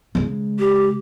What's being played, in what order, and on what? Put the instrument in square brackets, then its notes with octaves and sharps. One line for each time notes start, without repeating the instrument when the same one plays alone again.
[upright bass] C#3 G#3
[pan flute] G4